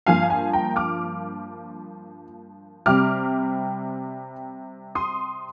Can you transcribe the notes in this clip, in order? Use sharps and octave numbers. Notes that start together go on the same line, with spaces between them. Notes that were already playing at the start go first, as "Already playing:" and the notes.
G2 F3 A#3 F4 F5 G#5
F5 G#5
G5 A#5
D6 F6
C3 G3 C4 D6 F6
C6 D#6